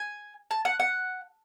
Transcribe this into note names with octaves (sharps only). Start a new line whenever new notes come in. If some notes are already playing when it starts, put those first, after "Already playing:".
Already playing: G#5
A5
F#5
F#5